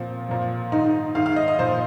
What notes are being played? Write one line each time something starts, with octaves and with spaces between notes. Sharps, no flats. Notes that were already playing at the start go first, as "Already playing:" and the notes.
Already playing: A#2 F3 C4
A#2 F3
G#2 D#3 D#4
G#2 D#3 F5
F5
D#5
D#5
A#2 F3 C5